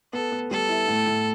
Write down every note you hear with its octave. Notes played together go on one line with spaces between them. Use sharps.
B3 A4
B3
G3 A4
E4
A2
A2